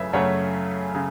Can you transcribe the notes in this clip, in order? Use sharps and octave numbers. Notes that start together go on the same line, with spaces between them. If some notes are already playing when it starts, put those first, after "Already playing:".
Already playing: F#2 C#3 A3 B4 C#5 E5
F#2 C#3 A3 C#5 F#5
C#3